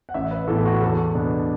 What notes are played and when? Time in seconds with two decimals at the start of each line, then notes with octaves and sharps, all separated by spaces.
0.09 F#5
0.14 A1 E5
0.31 B4
0.47 A2 E3 B3 A4
0.65 F#4
0.82 E2 A4
1.15 B2 B3 D4